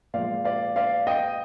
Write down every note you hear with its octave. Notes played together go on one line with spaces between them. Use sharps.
A#2 F3 G#3 D5 F5
D5 F5
D5 F5
D#5 G5